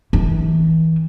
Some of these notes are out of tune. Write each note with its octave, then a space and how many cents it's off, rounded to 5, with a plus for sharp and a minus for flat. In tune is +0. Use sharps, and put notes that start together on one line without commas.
E3 -30